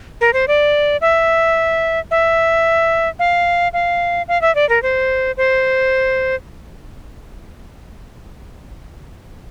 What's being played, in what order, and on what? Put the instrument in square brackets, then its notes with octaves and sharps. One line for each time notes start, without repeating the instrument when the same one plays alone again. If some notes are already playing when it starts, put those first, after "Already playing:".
[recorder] A#4
C5
D5
E5
E5
F5
F5
F5
E5
D5
A#4
C5
C5